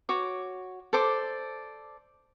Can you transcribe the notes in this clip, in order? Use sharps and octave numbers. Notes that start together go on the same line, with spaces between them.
F#4 C#5 D6
A4 C5 D5 D6